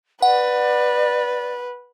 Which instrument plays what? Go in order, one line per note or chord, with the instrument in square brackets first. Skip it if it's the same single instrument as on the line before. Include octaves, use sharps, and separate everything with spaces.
[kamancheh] B4 [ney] D5 [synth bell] F#5